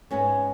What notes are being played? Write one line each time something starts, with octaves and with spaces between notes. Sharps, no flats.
G#2 G#3 B3 C#4